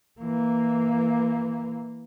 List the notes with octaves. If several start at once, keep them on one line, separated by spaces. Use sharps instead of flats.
E3 A#3